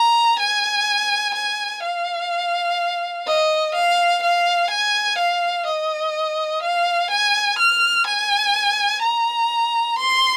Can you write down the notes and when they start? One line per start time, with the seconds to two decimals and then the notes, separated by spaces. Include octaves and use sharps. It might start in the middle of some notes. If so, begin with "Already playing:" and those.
Already playing: A#5
0.40 G#5
1.35 G#5
1.83 F5
3.27 D#5
3.75 F5
4.23 F5
4.71 G#5
5.19 F5
5.67 D#5
6.63 F5
7.11 G#5
7.59 F6
8.07 G#5
9.03 A#5
9.99 C6